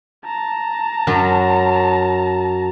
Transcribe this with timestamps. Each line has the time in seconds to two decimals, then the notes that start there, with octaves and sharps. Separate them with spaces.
0.25 A5 A#5
1.07 F#2 F#3 C#4